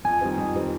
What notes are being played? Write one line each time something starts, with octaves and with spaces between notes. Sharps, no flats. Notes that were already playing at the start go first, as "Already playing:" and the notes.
F2 G#5
D#3 G3 C4
F2
D#3 G3 C4